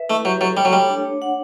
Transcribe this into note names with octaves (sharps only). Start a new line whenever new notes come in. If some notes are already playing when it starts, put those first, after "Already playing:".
Already playing: B4 E5
A3 E4
F#3 G4
F#3 A4
G3 C#5
F#3
G3 A3
D4
C#5
F#5